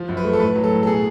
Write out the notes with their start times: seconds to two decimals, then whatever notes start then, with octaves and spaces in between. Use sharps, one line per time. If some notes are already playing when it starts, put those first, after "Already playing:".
Already playing: F3
0.08 F#2
0.17 B4
0.24 A3
0.33 A4
0.40 A2 B4
0.56 F#3
0.64 A4
0.71 A2
0.83 A4
0.87 B2 G#4